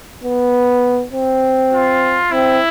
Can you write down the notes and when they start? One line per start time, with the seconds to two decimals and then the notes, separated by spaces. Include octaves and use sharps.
0.24 B3
1.13 C4
1.73 F4
2.31 C4 E4